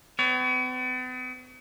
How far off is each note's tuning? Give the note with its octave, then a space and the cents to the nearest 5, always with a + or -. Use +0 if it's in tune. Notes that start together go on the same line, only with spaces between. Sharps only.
B3 +45 C#5 +25